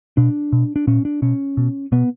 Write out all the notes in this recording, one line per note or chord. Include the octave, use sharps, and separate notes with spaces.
B2 D4
B2
D4
A#2 C#4
D4
B2 C#4
B2
B2 B3